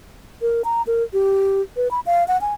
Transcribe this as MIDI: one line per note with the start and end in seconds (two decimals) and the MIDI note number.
0.42 0.62 70
0.64 0.82 82
0.87 1.03 70
1.13 1.61 67
1.77 1.91 71
1.91 2.00 83
2.06 2.26 77
2.28 2.40 78
2.41 2.54 80